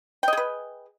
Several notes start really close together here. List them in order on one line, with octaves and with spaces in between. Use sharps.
G5 D#5 G#4 B4